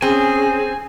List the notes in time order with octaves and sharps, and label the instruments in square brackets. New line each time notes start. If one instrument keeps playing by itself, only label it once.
[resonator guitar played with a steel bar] C4 [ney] C#4 [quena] G#4 [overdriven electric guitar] G#5